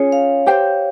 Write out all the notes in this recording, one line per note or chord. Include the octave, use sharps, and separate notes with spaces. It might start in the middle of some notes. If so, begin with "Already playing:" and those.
Already playing: C#4 F4 G#4 C#5
F5
G4 C5 G5